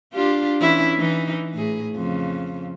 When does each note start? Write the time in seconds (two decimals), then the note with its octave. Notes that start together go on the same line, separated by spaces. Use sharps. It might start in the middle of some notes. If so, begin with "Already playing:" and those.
0.14 D4 F4 G4
0.61 E3 C#4 E4
0.98 E3 D#4
1.54 A2 G#4
1.95 F2 C#3